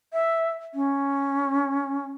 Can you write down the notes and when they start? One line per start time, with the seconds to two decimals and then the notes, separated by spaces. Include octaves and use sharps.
0.13 E5
0.74 C#4